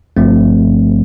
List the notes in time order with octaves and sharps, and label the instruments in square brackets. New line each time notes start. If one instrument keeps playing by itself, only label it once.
[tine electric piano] G1 G2 F3 A3 C4